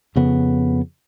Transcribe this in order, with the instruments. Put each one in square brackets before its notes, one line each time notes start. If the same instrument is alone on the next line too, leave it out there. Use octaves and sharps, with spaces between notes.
[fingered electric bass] F2 C#3 B3